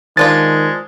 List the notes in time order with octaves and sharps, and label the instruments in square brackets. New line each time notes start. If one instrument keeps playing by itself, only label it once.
[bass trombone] D#3 [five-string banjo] F3 D4 F4 [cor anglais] G#3 [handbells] A6